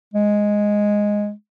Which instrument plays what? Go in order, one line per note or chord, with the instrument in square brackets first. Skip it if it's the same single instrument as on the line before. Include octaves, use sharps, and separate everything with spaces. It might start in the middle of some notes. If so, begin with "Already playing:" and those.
[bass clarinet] G#3